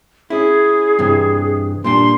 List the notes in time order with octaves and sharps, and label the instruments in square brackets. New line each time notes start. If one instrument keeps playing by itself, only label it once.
[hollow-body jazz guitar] C#4 E4 [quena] G#4
[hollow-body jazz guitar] G2 C3 E3
[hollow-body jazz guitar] A#2 G3 D4 [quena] C6